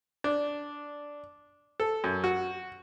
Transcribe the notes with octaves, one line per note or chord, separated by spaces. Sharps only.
D4
A4
F#2
F#4